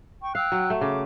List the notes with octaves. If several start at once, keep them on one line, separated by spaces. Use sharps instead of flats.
G5 C#6
F5 G5 E6 F#6
F#3
A3
C#3 D6